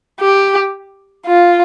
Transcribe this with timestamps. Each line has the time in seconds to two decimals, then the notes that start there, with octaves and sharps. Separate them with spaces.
0.20 G4
1.26 F4